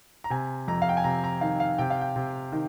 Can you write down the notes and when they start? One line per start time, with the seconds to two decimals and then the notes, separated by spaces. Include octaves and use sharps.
0.24 A#5
0.30 C3 G#5
0.68 F2 A#5
0.82 F5
0.89 G5
0.97 G#5
1.04 C3 A#5
1.24 A#5
1.41 D#3 F5
1.60 F5
1.79 C3 G5
1.90 F5
2.01 G5
2.16 C3
2.52 D#3